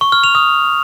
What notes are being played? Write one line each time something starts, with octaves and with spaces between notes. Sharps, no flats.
C#6
F6
F7
D#6